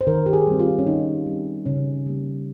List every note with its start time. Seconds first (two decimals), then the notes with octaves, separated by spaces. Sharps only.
0.01 C5
0.07 D#3 A#4
0.26 G4
0.33 G#4
0.47 G3 C4
0.59 F4
0.79 C#4
0.87 D#3 D#4
1.26 G3 C4
1.66 C#3 C#4
2.06 G3 A#3